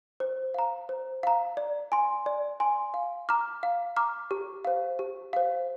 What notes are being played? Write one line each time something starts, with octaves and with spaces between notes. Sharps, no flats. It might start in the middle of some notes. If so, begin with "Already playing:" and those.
C5
F5 A#5
C5
F5 A#5
D5
G#5 C6
D5
G#5 C6
F5
A#5 D6 F6
F5
A#5 D6 F6
G4
C5 F5
G4
C5 F5